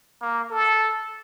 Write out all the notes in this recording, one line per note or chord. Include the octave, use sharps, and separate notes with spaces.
A#3
A4